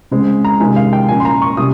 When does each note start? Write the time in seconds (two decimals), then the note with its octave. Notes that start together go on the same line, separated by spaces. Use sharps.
0.11 C#3 G#3 C4
0.45 A#5
0.60 C3 D#3 G#3 C#4 G#5
0.76 F5
0.93 G5
1.08 A#2 F3 A#3 C#4 G#5
1.20 C6
1.25 A#5
1.42 C#6
1.57 C3 G3 C#4 D#6